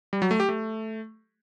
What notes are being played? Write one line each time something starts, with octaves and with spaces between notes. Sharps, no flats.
G3
F#3
A3
G4
A3